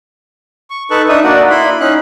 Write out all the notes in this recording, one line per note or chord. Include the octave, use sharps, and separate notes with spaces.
C#6
D#4 A4 B4 A5 C#6 F#6
D4 D#4 E5 D#6
A#3 D4 F#4 D5 F#5
E4 B5 C6
C#4 D#4 F#6